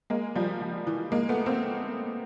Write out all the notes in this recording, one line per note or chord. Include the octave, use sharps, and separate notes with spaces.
G#3 A#3
F3 G3
F3
E3
G#3 A#3
A3 B3
A#3 C4